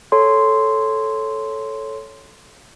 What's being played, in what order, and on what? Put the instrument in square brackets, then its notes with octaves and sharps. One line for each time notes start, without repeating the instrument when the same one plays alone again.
[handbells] A4 C#5 C6